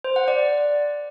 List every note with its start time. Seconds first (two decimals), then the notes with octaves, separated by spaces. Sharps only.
0.04 C5
0.16 F#5
0.28 D5